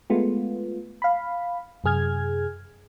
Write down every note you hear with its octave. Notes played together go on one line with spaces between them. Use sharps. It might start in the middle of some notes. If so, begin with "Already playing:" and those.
G#3 A3 B3 F4
F5 B5
F#2 C3 G#4 F6 G#6